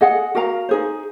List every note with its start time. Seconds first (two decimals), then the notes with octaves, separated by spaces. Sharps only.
0.01 G#4 D#5 F#5
0.35 F#4 A#4 F5 A#5
0.69 D#4 G#4 C5